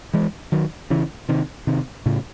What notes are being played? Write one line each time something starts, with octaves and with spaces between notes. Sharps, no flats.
E3 G#3
D#3 F#3
C#3 E3
C3 D#3
C3 D#3
A2 C#3